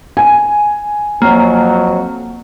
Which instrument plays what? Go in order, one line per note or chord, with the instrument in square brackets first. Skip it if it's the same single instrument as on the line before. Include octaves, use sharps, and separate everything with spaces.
[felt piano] G#5
[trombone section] F2 F#3 [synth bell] A#3